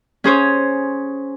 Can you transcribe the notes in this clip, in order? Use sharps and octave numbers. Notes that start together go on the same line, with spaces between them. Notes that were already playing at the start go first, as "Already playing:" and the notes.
C#4 G#4 C5 C#5